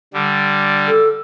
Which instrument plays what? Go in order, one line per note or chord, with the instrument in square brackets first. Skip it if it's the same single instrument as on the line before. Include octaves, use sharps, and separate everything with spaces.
[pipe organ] D3 G3
[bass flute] A4